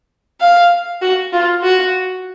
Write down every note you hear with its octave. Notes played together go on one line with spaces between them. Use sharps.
F5
F#4
F4
F#4